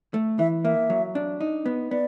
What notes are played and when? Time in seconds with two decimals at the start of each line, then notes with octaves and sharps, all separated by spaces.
0.14 A3
0.39 E3 E5
0.64 A#3 E5
0.90 F#3
1.15 D4
1.41 D#4
1.66 B3
1.91 B3 D5